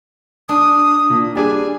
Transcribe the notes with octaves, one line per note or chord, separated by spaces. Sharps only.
D4 D#6
A#2
G3 D4 G#4 G#5